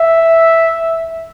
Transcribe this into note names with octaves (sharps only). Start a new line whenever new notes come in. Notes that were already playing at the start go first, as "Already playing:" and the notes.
Already playing: E5